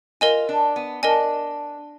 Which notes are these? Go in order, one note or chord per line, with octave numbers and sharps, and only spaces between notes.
F4 A#4 D#5 G#5
D4
B3
D4 A#4 D#5 G#5